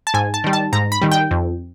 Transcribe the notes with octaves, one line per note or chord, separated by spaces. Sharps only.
A5
G#2 G#5
A5
D#3 G3
A5
G#2 A#5
B5
D#3 G3
G5
F2